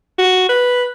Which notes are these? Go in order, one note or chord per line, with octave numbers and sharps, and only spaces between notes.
F#4
B4